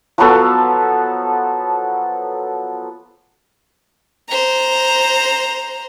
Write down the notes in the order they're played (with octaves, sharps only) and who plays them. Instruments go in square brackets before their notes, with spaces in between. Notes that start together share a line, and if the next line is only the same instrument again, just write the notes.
[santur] F3 F#3 B3 A4
[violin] C5 A#5